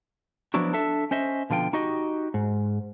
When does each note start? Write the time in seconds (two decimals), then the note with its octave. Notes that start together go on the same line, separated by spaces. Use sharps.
0.54 F3 F#3 B3 D4 E4 F#4
0.73 D4 A4 E5
1.11 C#4 C5 D#5 E5
1.50 B2 D3 F3 F4 G5
1.73 D#4 F#4 G4 D#5
2.34 G#2